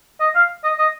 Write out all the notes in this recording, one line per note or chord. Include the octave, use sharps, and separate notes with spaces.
D#5
F5
D#5
D#5